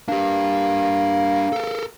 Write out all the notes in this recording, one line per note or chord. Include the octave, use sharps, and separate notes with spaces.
A#3 D4 G4
A4 A#4